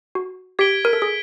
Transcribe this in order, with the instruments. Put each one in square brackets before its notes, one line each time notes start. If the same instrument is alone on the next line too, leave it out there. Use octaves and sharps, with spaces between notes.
[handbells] F#4
[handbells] G4 [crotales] G#6 B6 D7 G7
[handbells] A#4
A4
G#4